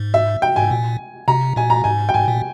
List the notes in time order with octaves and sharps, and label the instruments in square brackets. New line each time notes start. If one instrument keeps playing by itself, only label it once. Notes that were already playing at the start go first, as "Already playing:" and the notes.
Already playing: [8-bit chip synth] G#2
[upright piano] E5
G5
[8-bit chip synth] G#2 [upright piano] G#5
[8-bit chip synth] A#2
[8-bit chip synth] C3 [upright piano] A#5
[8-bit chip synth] A#2 [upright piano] G#5
[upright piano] A#5
[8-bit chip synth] G#2 [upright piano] G#5
[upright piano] G5
[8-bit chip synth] G#2 [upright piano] G#5
[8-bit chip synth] A#2